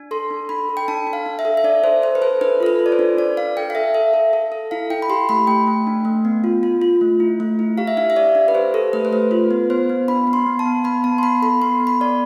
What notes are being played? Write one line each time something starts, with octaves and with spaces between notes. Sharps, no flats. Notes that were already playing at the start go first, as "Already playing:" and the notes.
Already playing: D4
A4 C6
D4
D4 B5
A4
G5
D4 A5
D4
F5
D4
E5
A4
E5
D4 D5
A4 C5
A4 C5
B4
A4 C5
D4 B4
F4 A4
B4
F4
D5
C5
D4
D4 D5
D4 F5
A4 G5
F5
A4 E5
A4 E5
A4
A4
A4
E4 F5
E4 G5
B5
G4 C6
A3 B5
A3 G5
A3
D4
A3
B3
F4
F4
F4
A3
E4
A3
E4
G4 F5
E5
D4 F5
E5
G4 D5
D4
B4
G4 C5
G4 A4
A3 B4
C5
A3 B4
F4 B4
B3
B3 C5
B3
D4 B5
B3
C6
B3
A5
B3
B3 B5
B3 A5
C6
B3 B5
A4 B5
B3 C6
B3
B5
B3 D5